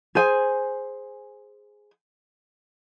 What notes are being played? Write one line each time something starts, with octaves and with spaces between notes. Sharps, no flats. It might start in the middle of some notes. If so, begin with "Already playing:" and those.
G#4 C5 G#5